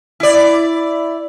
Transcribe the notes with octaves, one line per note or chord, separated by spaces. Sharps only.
E4 D5